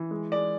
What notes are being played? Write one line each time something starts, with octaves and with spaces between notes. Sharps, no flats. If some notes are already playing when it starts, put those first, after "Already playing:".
Already playing: E3
G#3
G#3 D5